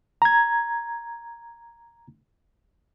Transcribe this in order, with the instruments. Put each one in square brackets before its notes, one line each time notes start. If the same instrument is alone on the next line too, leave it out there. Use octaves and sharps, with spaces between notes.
[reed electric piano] A#5 G#6